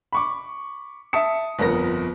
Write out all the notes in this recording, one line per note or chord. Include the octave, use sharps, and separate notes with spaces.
B5 C#6 D6
E5 A5 D#6 C#7
G1 F2 B3 A#4 A#6